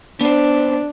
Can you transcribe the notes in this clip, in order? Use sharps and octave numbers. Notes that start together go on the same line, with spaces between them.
B3 D4 C5